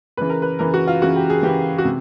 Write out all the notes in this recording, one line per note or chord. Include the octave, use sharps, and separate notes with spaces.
C#3 E3 B4
A#4
B4
C#3 E3 A#4
F#4
F4
C#3 E3 F#4
G4
G#4
C#3 E3 G4
F#4
C3